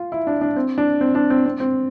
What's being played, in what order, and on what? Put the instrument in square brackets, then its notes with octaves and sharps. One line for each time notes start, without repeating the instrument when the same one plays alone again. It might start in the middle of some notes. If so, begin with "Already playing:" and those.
Already playing: [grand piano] F4
E4
D4
D4
C4
D4
C4
D4
C4
C4
C4